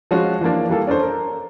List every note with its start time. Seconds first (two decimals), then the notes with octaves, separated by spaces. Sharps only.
0.11 F3 G#3 C#4 F#4
0.41 E3 F3 A#3 D4
0.69 E3 G3 A#3 A4
0.87 C#4 D4 A4 C5
1.02 A#4